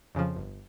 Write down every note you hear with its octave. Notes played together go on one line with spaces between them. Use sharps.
F2 C#3 F3
G1